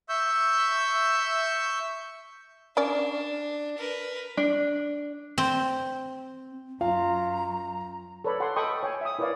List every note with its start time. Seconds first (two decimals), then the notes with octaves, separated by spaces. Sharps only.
0.09 E5 C#6 E6 G6
2.77 C#4 D4 A#4 D5
3.77 A#4 B4
4.37 D4
5.38 C4
6.81 F#2 F4 F5 A#5
8.24 A4 B4 C#5 D5 B5
8.40 A4 F#5 G5 A5 C6
8.56 A4 D#5 G5 B5 C#6 D#6
8.83 C#5 G5 G#5
9.01 E5 D#6
9.19 E4 A#4 B4 C#5 D5 F5